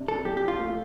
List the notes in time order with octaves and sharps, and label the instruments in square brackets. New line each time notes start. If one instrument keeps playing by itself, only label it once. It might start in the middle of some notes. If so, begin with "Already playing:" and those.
Already playing: [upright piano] C3 D4
[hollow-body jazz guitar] A4
[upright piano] F3 [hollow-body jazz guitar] G4
[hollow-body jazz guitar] G4
F4
[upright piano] A3